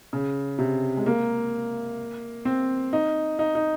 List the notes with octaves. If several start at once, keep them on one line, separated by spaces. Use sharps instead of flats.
C#3
C3
G#3
A#3
C4
D#4
D#4
D#4